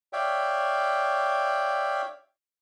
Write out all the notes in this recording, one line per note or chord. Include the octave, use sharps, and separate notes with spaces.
C#5 D5 E5 F5 G5